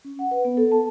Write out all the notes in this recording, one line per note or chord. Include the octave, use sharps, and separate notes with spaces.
C#4
F#5
B4
B3
A4
A5